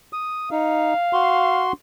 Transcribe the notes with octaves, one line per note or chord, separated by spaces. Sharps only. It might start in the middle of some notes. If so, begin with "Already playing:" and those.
D#6
D#4 F5
F#4 C6